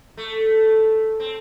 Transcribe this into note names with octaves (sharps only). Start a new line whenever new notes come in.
A3
C4